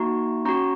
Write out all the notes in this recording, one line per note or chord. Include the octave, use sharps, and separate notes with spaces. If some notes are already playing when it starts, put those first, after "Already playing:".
Already playing: A#3 D#4 F#4 A#5 C#6
C#4 F#4 A#5 C#6